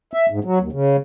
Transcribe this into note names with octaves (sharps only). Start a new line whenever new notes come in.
E5
G#2
F#3
D#2
C#3